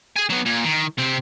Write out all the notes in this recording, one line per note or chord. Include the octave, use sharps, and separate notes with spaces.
G#4 G#5
F#3 B3
A#2
D#3
C3 C4